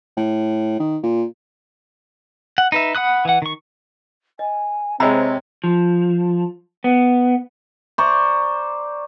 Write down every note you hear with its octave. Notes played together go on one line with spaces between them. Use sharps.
A2
D#3
A#2
F#5
D#4 B4 E5
F#5 B5 D#6 F#6
E3 F#5
D#3 C#6
D#5 G#5
C3 G#3 C4 C#5 A#5 B5 E6
F3
B3
C5 D5 A#5 C#6